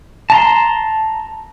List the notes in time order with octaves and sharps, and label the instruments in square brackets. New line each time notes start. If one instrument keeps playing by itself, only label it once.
[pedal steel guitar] A5 A#5 C6